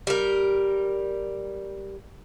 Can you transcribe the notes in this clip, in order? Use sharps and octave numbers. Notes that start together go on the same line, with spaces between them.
G3 A#4